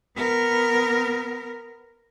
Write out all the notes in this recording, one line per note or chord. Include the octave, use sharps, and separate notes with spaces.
B3 A#4